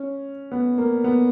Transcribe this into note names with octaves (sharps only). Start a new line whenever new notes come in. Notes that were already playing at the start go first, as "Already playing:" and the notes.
Already playing: C#4
B3
A#3
B3